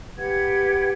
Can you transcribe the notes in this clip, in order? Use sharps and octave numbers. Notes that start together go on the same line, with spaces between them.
G4 B4 F#5 G#6